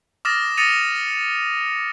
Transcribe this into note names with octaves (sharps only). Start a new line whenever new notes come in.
D6 D#6 F6 A6 A#6 E7
D#6 A6 A#6 C#7 D#7 F7